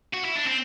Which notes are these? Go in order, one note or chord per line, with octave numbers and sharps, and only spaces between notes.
F#4
E4
D4
C4